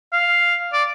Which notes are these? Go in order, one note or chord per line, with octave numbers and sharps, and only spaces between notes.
F5
D5